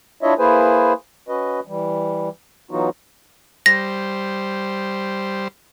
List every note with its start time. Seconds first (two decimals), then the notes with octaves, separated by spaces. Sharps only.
0.22 D4 E4 F4 C#5 D#5 E5
0.39 A#3 E4 G#4 B4 C5 G#5
1.28 C#4 F#4 B4 D#5
1.67 E3 G3
2.71 E3 F#3 B3 D#4 F4 F#4
3.66 G3 C5 A#6